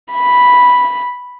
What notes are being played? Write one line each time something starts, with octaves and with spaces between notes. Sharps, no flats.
B5